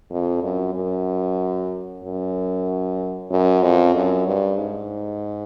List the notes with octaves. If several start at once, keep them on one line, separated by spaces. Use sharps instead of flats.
F2
F#2
F#2
F#2
F#2
F2
F#2
G2
G#2